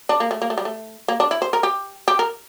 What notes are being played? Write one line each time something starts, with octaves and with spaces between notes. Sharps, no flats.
D4
A#3
A3
A#3
A3
G3
A3
A#3
D4
E4
C5
A#4
G4
G4
A#4